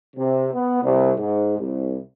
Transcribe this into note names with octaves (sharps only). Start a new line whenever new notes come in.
C3
B3
C2
G#2
C2